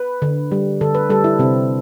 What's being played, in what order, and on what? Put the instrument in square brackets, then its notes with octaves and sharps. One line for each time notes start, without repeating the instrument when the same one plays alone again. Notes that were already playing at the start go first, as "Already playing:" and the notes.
Already playing: [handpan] B4
D3
G3
D3 A4
B4
G3 A4
E4
C3 C4